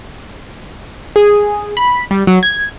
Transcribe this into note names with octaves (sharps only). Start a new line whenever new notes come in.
G#4
B5
G3
F#3
G#6